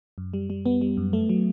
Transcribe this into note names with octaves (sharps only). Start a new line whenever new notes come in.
F#2
G3
G3
G3 B3
G3
F#2
A3
F#3